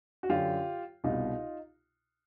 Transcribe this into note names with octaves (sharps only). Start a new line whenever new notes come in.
F#4
F#2 D3 F4 G4
C2 B2 D#4 F4